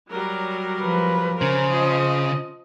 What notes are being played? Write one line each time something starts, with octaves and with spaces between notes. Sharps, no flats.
F#3 G3 A#4
F3 B4
C#3 A#4 C5
F3 D#5